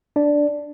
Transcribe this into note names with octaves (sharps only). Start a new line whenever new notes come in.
D4 D5